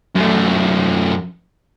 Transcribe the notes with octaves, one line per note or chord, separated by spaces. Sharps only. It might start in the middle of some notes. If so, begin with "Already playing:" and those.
F#2 A3